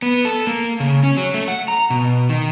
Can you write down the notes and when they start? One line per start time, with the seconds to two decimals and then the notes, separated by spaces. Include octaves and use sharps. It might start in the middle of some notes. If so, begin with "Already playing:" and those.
0.02 B3
0.25 A4
0.47 A#3
0.80 C#3
1.03 C#4
1.17 F#3
1.34 A3
1.48 F#5
1.68 A#5
1.90 B2
2.29 D#3